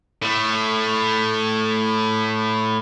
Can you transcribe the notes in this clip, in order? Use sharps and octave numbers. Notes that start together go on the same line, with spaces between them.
A2 A3